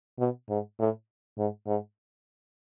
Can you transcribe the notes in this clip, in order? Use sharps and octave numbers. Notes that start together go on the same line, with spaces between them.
B2
G#2
A2
G#2
G#2